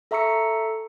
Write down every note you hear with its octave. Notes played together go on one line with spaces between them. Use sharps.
A4 E5 A#5 C#6 E6 C#7